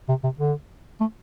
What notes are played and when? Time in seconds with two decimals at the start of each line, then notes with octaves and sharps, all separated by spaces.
0.09 C3
0.24 C3
0.39 D3
1.01 A3